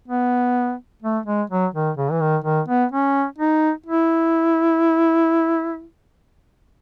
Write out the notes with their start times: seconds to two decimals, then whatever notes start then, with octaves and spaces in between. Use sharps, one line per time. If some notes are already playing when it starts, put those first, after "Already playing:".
0.08 B3
1.02 A3
1.26 G#3
1.50 F#3
1.74 D#3
1.97 C#3
2.11 E3
2.20 D#3
2.44 D#3
2.68 B3
2.92 C#4
3.38 D#4
3.86 E4